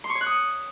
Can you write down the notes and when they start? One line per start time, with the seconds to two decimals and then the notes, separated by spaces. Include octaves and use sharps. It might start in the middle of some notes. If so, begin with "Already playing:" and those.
0.04 C6
0.10 C#6
0.15 C#5
0.21 F#6
0.26 D#6